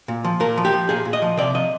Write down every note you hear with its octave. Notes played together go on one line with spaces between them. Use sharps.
A#2
F3
A#2 A#4
F3
G4
F3
A#2 G#4
A#2
D#5
F3
C3 D5
F3 D#5